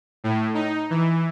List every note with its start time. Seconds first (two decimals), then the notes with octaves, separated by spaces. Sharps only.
0.24 A2
0.55 D#4
0.90 E3